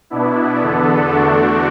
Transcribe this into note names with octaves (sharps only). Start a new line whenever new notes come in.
B2 B3 D4 E4
E2 D3 B3 D4 A4
E2 D3 A3 D4 F#4